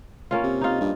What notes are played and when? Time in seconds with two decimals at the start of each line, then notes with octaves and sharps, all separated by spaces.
0.31 A#3 C#4 F4
0.43 C3
0.61 D#4 F4
0.81 G2